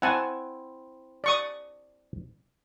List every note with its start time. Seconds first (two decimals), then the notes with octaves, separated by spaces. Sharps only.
0.02 C4 E4 F#5 G#5 A5
1.24 D5 C#6 D#6